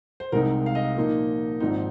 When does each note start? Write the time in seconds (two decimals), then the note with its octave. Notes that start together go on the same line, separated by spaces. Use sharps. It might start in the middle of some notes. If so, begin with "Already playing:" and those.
0.20 C5
0.32 C2 C3 G#3 D#4 A#4
0.66 F5
0.75 D#5
0.96 A#2 F3 A#3 D#4
1.60 G#1 G#2 F3 C4 D#4